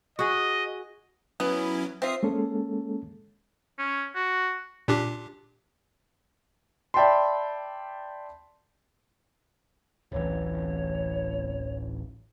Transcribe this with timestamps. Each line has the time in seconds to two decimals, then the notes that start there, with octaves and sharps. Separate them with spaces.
0.19 F#4 G#4 D#5
1.40 F#3 B3 C#4 E4
2.02 C4 F4 E5 D#6 C7
2.23 G#3 A#3 C#4 A4
3.79 C#4
4.15 F#4
4.88 A#2 D4 G4
6.94 D5 E5 G5 A5 B5 C6
10.12 D1 A1 E3 C#5